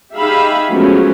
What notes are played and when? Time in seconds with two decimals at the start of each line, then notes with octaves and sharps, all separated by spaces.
0.15 D#4 G4 G#4 E5 F5 B5
0.70 F3 F#3 G#3 A3 B3 C#4